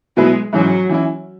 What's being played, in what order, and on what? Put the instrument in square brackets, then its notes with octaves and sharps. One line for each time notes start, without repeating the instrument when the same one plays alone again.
[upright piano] B2 F#3 E4 G#4 B4 [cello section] G#3
[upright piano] G#2 E3 C#4 G#4 [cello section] F#3
[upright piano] E3 C#4 E4